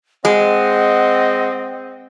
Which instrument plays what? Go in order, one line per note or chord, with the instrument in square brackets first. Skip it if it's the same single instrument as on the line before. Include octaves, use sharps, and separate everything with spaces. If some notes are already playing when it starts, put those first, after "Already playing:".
[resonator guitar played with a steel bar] G#3 [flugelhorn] C4 [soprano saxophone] D#5 [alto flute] F#5